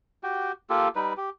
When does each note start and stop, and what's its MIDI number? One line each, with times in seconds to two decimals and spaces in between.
0.23 0.52 66
0.23 0.52 67
0.23 0.52 79
0.70 0.88 58
0.70 0.88 65
0.70 0.88 67
0.70 0.88 69
0.95 1.13 55
0.95 1.13 63
0.95 1.13 71
1.17 1.30 67